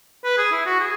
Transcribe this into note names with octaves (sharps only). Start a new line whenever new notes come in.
B4
G#4
E4
F#4
G#4